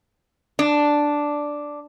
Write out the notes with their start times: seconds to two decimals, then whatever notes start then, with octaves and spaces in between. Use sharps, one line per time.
0.59 D4